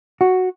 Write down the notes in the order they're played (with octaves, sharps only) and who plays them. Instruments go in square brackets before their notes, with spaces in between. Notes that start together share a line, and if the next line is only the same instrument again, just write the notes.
[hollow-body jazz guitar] F#4